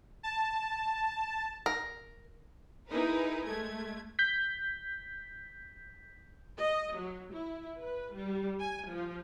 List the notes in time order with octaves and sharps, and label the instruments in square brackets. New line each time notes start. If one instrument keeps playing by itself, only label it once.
[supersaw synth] A5
[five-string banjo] A#4
[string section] D#4 E4 G#4 A#4 B4
G#3 A3 G#6
[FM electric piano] G6 B6
[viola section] D#5
F#3
E4
B4
G3
G#5
F3